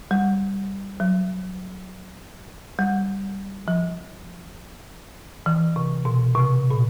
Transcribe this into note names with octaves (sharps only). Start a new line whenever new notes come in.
G3
F#3
G3
F3
E3
C3
B2
C3
A#2